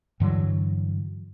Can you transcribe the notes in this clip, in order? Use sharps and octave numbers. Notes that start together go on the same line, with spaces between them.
G2 D3 E3 F#3